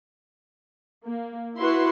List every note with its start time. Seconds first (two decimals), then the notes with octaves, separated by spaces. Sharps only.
1.07 A#3
1.57 E4 F#4 B4 C6